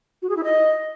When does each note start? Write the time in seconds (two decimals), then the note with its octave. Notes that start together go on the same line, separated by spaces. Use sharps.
0.22 F#4
0.29 G#4
0.37 E4
0.44 D#5